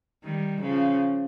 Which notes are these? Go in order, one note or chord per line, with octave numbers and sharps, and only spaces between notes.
D#3 G3
C#3 F3